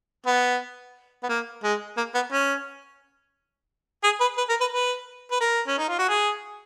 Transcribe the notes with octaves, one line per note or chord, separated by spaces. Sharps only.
B3
B3
A#3
G#3
A#3
B3
C#4
G#4
B4
B4
A#4
B4
B4
B4
A#4
C#4
D#4
F4
F#4
G#4